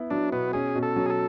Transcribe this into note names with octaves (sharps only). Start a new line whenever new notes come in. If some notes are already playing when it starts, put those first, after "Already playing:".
Already playing: B3 E4
F#3 D4
B2 B3
C#4 G#4
B2
A4
F#3
G#4
A4